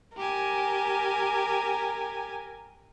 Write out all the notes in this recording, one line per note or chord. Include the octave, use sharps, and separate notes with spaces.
G4 A#4 G#5